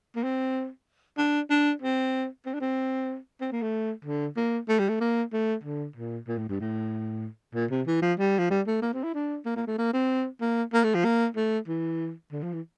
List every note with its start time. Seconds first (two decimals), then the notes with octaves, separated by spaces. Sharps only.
0.16 A#3
0.23 C4
1.18 D4
1.50 D4
1.82 C4
2.46 C4
2.54 D4
2.60 C4
3.41 C4
3.52 A#3
3.62 A3
4.05 D3
4.37 A#3
4.68 A3
4.79 G3
4.89 A3
5.01 A#3
5.33 A3
5.64 D3
5.96 A#2
6.28 A#2
6.38 A2
6.49 G2
6.60 A2
7.54 A#2
7.71 C3
7.87 E3
8.02 F3
8.19 G3
8.39 F3
8.50 G3
8.67 A3
8.82 A#3
8.93 C4
9.03 E4
9.15 D4
9.46 A#3
9.56 A#3
9.67 A3
9.78 A#3
9.93 C4
10.41 A#3
10.74 A#3
10.84 A3
10.95 F3
11.05 A#3
11.36 A3
11.68 E3
12.32 D3
12.43 F3
12.53 E3